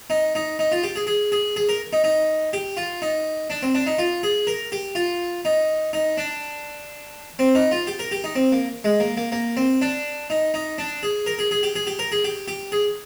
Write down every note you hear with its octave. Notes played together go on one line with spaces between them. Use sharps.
D#4
D#4
D#4
F4
G4
G#4
G#4
G#4
G#4
A#4
D#4
D#4
G4
F4
D#4
D4
C4
D4
D#4
F4
G#4
A#4
G4
F4
D#4
D#4
D4
C4
D#4
F4
G4
A#4
G4
D#4
C4
A#3
G#3
A#3
A#3
A#3
C4
D4
D#4
D#4
D4
G#4
A#4
G#4
G#4
G4
G#4
G4
A#4
G#4
G4
G4
G#4